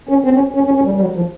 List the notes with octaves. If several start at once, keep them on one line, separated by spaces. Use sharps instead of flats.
C#4
C4
C#4
C#4
C#4
C#4
G3
G3
F#3
F3